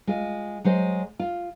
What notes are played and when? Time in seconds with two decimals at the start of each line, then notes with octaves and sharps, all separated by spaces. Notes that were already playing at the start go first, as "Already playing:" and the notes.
0.07 G#3 F4
0.64 F#3 G#3 C5
1.19 F4